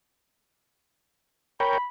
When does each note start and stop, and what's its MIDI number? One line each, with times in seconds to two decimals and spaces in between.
1.60 1.78 70
1.60 1.78 73
1.60 1.78 79
1.60 1.88 83